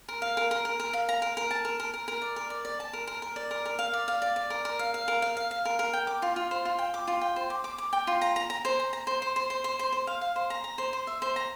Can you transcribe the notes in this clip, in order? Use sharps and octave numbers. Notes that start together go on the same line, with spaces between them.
A#4
F5
A#4
A#4
A#4
A#4
F5
A#5
A#4
A#4
A5
A#4
A#4
A#4
A#4
D5
A#4
D5
D5
A5
A#4
A#4
A#4
D5
A#4
A#4
F5
D5
F5
D5
D5
A#4
A#4
F5
F5
A#4
F5
F5
F5
A#4
A#4
G5
D6
F4
F4
C5
F4
G5
D6
F4
G5
C5
D6
D6
D6
G5
F4
A#5
A#5
A#5
C5
A#5
A#5
C5
C5
C5
C5
C5
C5
C5
F5
F5
C5
A#5
A#5
C5
C5
E5
C5
A#5